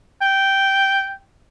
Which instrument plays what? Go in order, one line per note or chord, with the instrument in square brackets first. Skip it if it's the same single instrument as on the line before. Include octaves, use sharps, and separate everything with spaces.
[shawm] G5